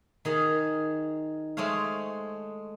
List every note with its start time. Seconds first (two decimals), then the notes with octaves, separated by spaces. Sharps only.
0.25 D#3 G#4 F5
1.57 G#3 A3 C5 C#5 F5